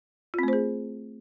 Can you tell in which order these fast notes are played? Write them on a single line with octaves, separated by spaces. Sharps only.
F4 C4 A3 C5 G#4